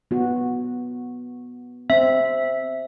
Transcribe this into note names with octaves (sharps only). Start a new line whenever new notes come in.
B3 F#4
C4 E5